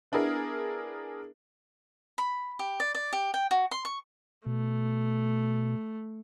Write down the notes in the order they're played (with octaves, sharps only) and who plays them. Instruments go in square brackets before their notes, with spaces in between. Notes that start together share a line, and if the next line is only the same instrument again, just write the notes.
[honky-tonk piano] B3 D4 E4 G#4 A#4
[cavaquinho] B5
G4
D5
D5
G4
G5
F#4
C6
C#6
[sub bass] B2 [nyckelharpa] A3